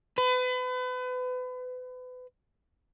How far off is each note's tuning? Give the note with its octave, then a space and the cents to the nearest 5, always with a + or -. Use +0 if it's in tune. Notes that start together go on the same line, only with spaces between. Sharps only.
B4 +35